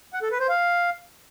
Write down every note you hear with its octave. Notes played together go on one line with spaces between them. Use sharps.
F#5
A4
B4
C5
F5